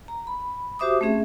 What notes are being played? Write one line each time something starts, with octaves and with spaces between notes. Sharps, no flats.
A#5
B5
F#4 G4 C5 E5 D6 D#6
A3 C4 C#4 G#4 E5